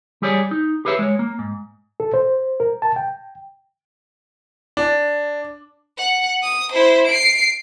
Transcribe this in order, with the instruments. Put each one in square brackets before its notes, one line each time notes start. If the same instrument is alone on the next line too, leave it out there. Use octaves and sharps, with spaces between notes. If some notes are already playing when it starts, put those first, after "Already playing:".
[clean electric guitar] G3 G4 G#4 C#5 D5
D#4
G4 G#4 B4 C#5 E5
G#3 C#5
A#3
G#2
[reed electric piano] A4
C5
A#4
A5
G5
[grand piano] D4
[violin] F#5
D#6
E4 C5
C7 D7